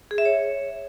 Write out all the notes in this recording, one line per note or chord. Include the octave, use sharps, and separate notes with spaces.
G#4
E5
C#5